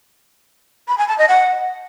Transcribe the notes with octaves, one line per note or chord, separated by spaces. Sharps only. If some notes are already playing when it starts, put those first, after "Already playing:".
B5
G#5
A5
D#5
F#5